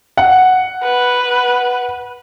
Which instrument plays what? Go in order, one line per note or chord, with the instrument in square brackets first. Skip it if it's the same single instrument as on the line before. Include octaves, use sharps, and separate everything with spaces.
[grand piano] F#5
[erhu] B4